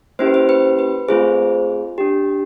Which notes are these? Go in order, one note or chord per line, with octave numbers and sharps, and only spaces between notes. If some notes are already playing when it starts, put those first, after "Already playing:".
A#3 C#4 E4 G4 C5
B4
C5
B4
B4
A3 C4 F4 G#4 C5
D4 G4